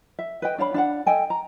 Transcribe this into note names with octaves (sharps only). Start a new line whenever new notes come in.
E5
B4 D#5 G5
D4 C#5 F5 B5
D4 F5 F#5
A4 D#5 G5 G#5
A#5